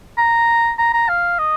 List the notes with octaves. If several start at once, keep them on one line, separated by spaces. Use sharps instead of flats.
A#5
A#5
A#5
F5
D#5